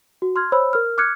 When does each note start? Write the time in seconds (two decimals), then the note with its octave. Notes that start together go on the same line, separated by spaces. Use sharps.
0.22 F#4
0.36 C6 F6 G#6
0.52 C5 C#5 B5 E6
0.73 A#4 F6
0.98 D6 F6 F#6 G#6 C#7